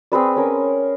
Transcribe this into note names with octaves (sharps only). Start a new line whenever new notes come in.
C4 G#4 B4 D5
C#4 A#4